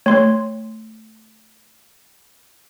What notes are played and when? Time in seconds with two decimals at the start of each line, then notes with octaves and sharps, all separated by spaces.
0.06 A3 C#5 C6